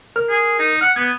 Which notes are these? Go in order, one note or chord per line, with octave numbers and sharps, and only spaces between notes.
A#4 F6
G#4
D#4
F#5 F6
B3 G#6